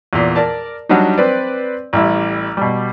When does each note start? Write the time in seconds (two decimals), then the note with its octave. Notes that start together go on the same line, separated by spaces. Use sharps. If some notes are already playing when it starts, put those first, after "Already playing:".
0.13 E2 A#2
0.36 A#4 D5 A5
0.89 F#3 G3 D4 D#4
1.18 C4 B4 C5 D5
1.93 A1 G3 E4
2.57 B2 G3